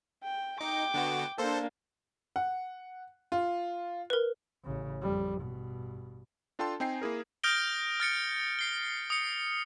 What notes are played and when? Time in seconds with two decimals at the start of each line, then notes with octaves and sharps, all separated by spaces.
0.24 G5
0.61 D#4 G5 D6
0.94 D3 B3 F#4
1.38 A#3 D4 A4 C5
2.36 F#5
3.32 F4
4.10 A#4 B4
4.64 A1 C#3
5.02 F2 G3
5.41 G2 B2
6.59 D4 F4 A4 G5 A5 C6
6.80 C4 D#4 G5 G#5 C7
7.02 A#3 E4 G#4 A#4
7.44 D#6 F6 G6 A#6 D7 G7
8.00 F6 A6 C#7 D7
8.59 C7 G7
9.10 D#6 C#7